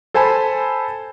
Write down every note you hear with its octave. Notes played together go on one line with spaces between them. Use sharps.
A4 C5 G#5 A5 B5